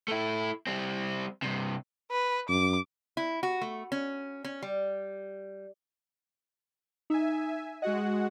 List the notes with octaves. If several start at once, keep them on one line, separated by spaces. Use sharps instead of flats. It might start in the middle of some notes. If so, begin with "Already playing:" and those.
A3 E4
G3 C4
G2 C3
B4
F#2 D6
E4
F#4
A3
C#4
C#4
G3
D#4 E5 G#5
G#3 F#4 D#5 F#5